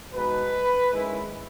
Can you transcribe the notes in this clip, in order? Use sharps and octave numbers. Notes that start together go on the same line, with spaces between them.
B2 G#3 D#4 B4
D#3 G#3 C#4 E4